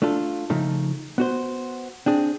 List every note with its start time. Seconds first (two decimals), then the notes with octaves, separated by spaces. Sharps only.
0.02 A3 D4 F4 A4
0.50 C#3 F3 A3 D#4
1.18 B3 F#4 C5
2.06 C4 D4 G#4